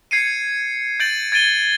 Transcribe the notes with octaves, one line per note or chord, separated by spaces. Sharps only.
G#6 C7 C#7 D#7
G6 A6 D7 F#7
G#6 A6 D7 D#7 G7